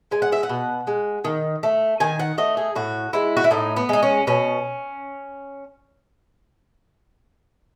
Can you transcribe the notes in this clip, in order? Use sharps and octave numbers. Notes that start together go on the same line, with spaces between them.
G#3 G#5
F#5
E5
F#5
B2
G#3
D#3
A3
D#3 G#5
F#5
A3 D#5
G#4
A2 F#4
G#3 E4
F#4
E4
A2 D#4
B3
G#3 D#4
C#4
B2 C#4